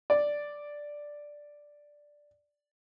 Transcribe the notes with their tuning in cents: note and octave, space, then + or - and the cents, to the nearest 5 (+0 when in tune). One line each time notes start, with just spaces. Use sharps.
D5 +0